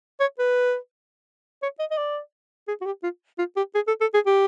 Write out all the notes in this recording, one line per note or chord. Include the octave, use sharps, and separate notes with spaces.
C#5
B4
C#5
D#5
D#5
D5
G#4
F#4
G4
F4
F4
G4
G#4
A4
A4
G#4
G4